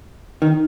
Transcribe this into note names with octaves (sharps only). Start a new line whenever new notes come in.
D#3